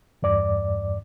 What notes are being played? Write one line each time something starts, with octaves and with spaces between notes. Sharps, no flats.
E2 G2 D5 D6